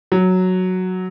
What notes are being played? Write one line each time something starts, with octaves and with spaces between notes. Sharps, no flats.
F#3